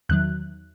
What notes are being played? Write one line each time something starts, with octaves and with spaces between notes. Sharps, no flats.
E2 D#3 F#3 F#6